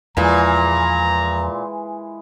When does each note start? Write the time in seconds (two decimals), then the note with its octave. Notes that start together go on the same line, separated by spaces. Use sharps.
0.17 E2 A#2 E3 F3 G#3 A#5